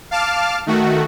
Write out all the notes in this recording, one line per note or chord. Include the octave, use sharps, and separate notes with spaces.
F5 A5 D6 F6
D#3 A3 F#4